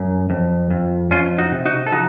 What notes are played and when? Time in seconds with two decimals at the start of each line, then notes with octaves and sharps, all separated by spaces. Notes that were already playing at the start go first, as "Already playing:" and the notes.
Already playing: F#2
0.30 F2
0.70 F2
1.11 F2 C#4 F4
1.38 D#4 F#4
1.52 C3
1.66 D#4 F#4
1.87 A4
1.92 F3 D#4 F#4